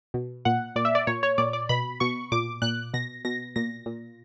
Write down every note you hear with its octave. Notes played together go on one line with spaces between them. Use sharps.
B2
A#2 F#5
A#2 D5
E5
D5
A#2 C#5
C#5
A#2 D5
D5
B2 B5
B2 C#6
A#2 D6
A#2 F#6
B2 A#6
B2 A#6
A#2 A#6
A#2